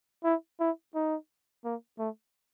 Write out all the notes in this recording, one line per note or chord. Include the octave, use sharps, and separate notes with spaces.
E4
E4
D#4
A#3
A3